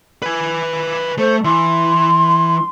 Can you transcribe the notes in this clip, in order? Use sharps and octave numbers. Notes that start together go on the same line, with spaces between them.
B4 G#5
A3 C5
E3 C6